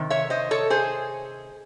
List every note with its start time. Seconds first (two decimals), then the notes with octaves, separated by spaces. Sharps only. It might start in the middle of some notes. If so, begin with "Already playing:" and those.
Already playing: C3 D#3
0.10 C#5 E5
0.30 C5 D#5
0.51 A4 C#5
0.70 G#4 C5